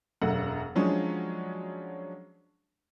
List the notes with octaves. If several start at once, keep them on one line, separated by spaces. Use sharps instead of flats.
E1 F#2 A3 F#5
F3 F#3 G#3 C#4 D4